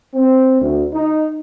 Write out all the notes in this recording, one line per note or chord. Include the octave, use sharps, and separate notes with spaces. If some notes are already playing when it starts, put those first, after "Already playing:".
C4
D2
D#4